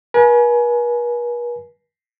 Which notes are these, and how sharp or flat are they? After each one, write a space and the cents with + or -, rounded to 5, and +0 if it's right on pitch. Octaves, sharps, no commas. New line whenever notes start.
B4 -45 G#5 +25